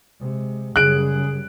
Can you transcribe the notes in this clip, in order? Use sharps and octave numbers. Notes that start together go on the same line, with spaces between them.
C3 G#3
F#2 C#3 G3 G#4 F#6 D7